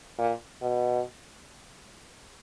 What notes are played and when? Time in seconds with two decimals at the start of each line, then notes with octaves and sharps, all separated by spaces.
0.18 A#2
0.62 B2